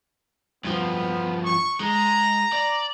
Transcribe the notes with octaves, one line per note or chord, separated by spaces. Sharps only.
G2 F3 B3
C#6
G#3 A#5
D5